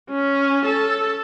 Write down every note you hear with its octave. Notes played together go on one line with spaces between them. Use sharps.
C#4
A4